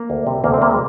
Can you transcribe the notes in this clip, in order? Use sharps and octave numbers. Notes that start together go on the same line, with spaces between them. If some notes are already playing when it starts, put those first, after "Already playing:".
Already playing: A#3
D2
C3 G3
D2 A#3
C4
C3 G3 A#3
G#3